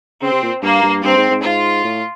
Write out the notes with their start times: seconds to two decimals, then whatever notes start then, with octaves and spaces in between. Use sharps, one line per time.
0.22 C#3 C4
0.32 C3
0.42 A#2
0.62 G2 A#3
0.83 G2
1.04 G2 C4
1.17 G#2
1.30 G#2
1.43 G#2 F4
1.85 A2